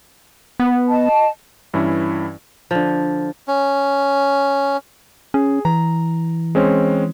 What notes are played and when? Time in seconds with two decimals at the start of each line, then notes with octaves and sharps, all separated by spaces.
0.60 B3
0.87 D#5 A5
1.74 G2 E3 C#4 E4
2.71 D3 F3
3.48 C#4
5.34 C#4 G#4
5.65 E3 A#5
6.55 G#3 C4 C#4